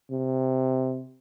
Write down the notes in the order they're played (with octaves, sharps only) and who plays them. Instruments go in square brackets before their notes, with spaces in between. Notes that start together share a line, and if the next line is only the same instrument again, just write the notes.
[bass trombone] C3